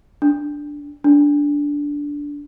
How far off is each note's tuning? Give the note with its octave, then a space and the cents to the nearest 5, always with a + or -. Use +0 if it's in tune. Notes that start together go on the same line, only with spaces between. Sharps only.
D4 +0
D4 -15